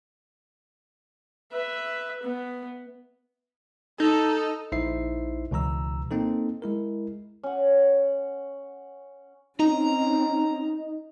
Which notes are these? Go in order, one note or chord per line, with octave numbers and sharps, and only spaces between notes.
B4 E5
B3
D#4 A4
A#1 D#4 E4 C5 E5 C7
C#2 B2 E3 A#5 E6
A#3 C4 D#4 A4
G#3 E4 A#4
C#4 F#5
C4 C#4 D#4 A#5